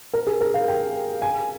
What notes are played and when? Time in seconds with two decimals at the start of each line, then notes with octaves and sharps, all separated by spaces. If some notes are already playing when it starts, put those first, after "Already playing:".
0.13 A#4
0.27 G#4
0.41 A#4
0.54 F5
0.68 G5
1.22 G#5